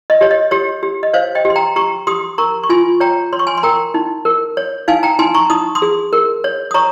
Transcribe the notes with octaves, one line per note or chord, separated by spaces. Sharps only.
D#5
G4 C#5
D#5
G4 C#5
G4
D#5
C5 C#5 F5
D#5 G5
G4
C6
G5 A#5
G4 A#5 C#6
G4 C6 D#6
A#4 A#5 C#6
C#6
F4 G#5 C6
C#5 G5 A#5
C#5 C6
C#6
G#5 C6
C6
A#4 G5 A#5
D#4
A#4
C#5
D#4 F5 G#5
G5 A#5
D#4 G#5 C6
A#5 C#6
D#4 D#6
C6 D#6
G#4
A#4
C#5
D#6
C#5 A#5 C#6